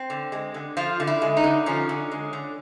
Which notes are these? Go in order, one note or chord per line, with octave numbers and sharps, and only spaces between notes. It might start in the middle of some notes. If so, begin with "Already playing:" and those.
Already playing: C4
D3
G#3
D3
F3 F4
D3
E4
G#3
D#4
D3
F3 C#4
D3
G#3
D3